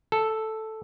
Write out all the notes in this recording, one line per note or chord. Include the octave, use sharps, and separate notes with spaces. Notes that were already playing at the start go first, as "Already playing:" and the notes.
A4